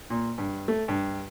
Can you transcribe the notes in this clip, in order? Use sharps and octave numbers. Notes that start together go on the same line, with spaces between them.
A#2
G2
A3
G2